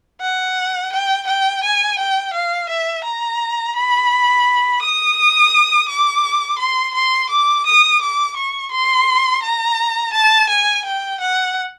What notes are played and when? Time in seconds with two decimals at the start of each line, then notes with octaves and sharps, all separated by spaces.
0.21 F#5
0.93 G5
1.27 G5
1.63 G#5
1.99 G5
2.34 F5
2.69 E5
3.04 A#5
3.76 B5
4.82 D#6
5.89 D6
6.59 C6
6.95 C6
7.30 D6
7.66 D#6
8.01 D6
8.37 C#6
8.72 C6
9.43 A#5
10.13 A5
10.50 G#5
10.85 G5
11.20 F#5